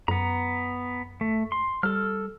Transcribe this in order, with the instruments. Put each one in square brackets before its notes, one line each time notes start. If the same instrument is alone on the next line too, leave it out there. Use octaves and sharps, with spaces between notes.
[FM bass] F#2 [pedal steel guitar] B3 A#5
[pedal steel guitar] A3
C6
[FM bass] G3 [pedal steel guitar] A4 F6